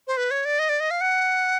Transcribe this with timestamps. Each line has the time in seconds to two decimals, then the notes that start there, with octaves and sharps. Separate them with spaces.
0.07 C5
0.17 B4
0.31 C#5
0.45 D5
0.59 D#5
0.69 D5
0.80 D#5
0.91 F5
1.01 F#5